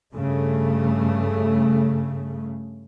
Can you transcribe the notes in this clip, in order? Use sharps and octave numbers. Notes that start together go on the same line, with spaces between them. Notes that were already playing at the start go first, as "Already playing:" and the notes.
G2 C#3 A3